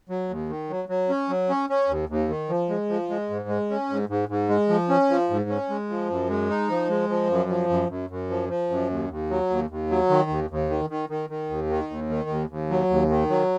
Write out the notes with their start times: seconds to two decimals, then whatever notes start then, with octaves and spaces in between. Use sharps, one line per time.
0.09 F#3
0.29 D#2
0.49 D#3
0.70 F#3
0.89 F#3
1.09 C#4
1.29 F#3
1.49 C#4
1.70 C#4
1.89 D#2
2.09 D#2
2.29 D#3
2.49 F3
2.70 G#3
2.89 F3
3.10 G#3
3.30 G#2
3.49 G#3
3.70 C#4
3.90 G#2
4.09 G#2
4.29 G#2
4.49 G#3
4.69 F3
4.89 C#4
5.10 F3
5.30 G#2
5.49 C#4
5.70 G#3
5.89 F3
6.10 F#2
6.30 G#3
6.49 D#4
6.70 F3
6.89 G#3
7.09 F3
7.29 F#2
7.49 F3
7.69 F#2
7.89 F#2
8.10 F#2
8.30 F3
8.49 F3
8.70 F#2
8.90 D#2
9.09 D#2
9.30 F#3
9.50 D#2
9.70 D#2
9.90 F#3
10.10 D#3
10.30 D#2
10.50 D#2
10.69 D#3
10.90 D#3
11.09 D#3
11.30 D#3
11.50 D#2
11.70 D#3
11.90 D#2
12.10 D#3
12.29 D#2
12.49 D#2
12.70 F#3
12.90 D#2
13.10 D#3
13.30 F#3